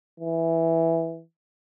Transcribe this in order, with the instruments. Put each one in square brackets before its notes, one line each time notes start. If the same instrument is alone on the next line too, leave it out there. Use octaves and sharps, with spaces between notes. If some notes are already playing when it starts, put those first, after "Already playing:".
[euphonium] E3